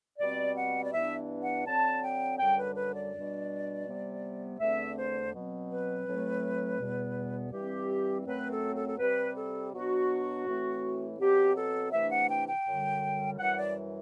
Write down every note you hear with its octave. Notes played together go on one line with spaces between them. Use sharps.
B2 G3 C4 D5
F#5
D5
G2 E3 B3 D4 E5
F#5
D3 F#3 C4 A5
G5
F#2 D3 G3 G5
B4
B4
D5
B2 G3 D4
C3 G3 B3
E2 D3 A3 C4 E5
C5
B2 F#3 C4
B4
A2 F#3 A3 C4
E2 B2 G3 B3
G2 E3 G3 C4 G4
F#2 F#3 A3 C4 B4
A4
A4
A4
C3 G3 C4 B4
A4
B2 F#3 B3 D4 F#4
A2 E3 A3 C4
B2 F#3 C4 G4
A4
C3 E3 A3 D4 E5
F#5
G5
G5
F#2 D3 G3
F#2 E3 G3 F#5
D5